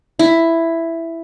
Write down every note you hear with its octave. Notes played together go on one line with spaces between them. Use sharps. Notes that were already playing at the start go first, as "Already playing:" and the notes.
E4